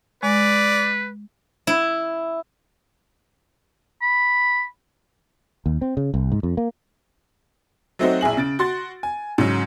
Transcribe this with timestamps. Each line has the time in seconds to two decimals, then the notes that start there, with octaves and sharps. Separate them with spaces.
0.23 G#3 B4 D5
1.67 E4
4.02 B5
5.66 D#2
5.81 C4
5.97 C#3
6.14 C2
6.32 G#2
6.43 F2
6.57 A#3
7.99 F#3 A3 C4 D#4 F#4 C5
8.21 A#1 E4 G#4 F#7
8.37 C#3 A6 D7
8.59 F#4 C6 A6
9.03 G#5
9.38 G#2 C#3 F#3